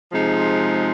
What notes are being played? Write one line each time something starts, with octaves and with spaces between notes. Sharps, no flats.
C3 F3 G#3 D#4